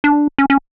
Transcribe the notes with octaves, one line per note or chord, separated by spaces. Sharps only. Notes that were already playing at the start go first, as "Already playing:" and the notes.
D4
C#4
C#4